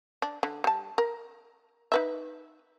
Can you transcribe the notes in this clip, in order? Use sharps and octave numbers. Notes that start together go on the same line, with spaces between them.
D4
D3
G3 A5
A#4
D#4 B4 E5